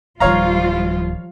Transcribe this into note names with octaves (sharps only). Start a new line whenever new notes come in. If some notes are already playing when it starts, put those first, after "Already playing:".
D1 D#3 F3 G3 F4 C#5 F5 A#5